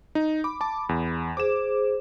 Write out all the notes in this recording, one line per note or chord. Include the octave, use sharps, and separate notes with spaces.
D#4
B5 D6
A5 D6
E2
G#4 C5 D6 E7